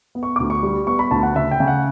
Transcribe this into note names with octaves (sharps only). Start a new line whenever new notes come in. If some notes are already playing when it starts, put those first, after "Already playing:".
B3
C#6
D2 D6
C#6
G3
B3 C#6
B5
D2 A5
F#5
C#3 E5
G5
C#3
F#5